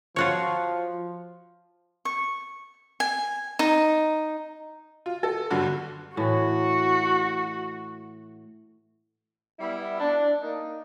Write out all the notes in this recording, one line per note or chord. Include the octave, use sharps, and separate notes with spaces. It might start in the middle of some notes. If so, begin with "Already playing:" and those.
F3 F4 F#4 C#5
C#6
G#5
D#4
F4
A4
G1 G2 D3 F#4
A2 E3 F#4
G3 B3 E4
D4
A#3 D#4